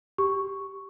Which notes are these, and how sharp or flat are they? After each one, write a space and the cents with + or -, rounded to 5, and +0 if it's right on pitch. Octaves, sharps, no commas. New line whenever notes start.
G4 +0 C#6 +0